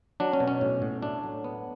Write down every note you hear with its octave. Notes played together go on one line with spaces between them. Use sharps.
F#3 D4
C#4
B2
C#4
A2
A2
A3 D4
F#3
B3